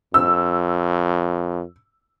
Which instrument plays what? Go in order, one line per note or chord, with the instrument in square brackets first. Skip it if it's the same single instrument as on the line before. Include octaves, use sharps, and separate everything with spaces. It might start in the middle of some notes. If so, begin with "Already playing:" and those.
[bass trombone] F2 [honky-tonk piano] E6